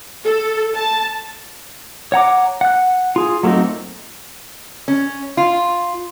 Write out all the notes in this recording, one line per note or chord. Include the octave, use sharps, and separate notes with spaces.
A4
A5
C#5 F#5 A#5 D6
F#5 F#6
F4 G#4
F#3 A3 A#3 C4 D#4
C#4
F4